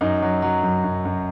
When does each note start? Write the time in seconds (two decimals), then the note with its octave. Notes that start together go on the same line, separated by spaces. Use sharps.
0.01 F#2 D#4
0.22 F#3
0.42 F#3
0.63 F#2
0.84 F#2
1.05 F#2